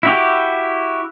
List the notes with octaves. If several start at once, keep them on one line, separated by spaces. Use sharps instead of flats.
E4 F#4 G4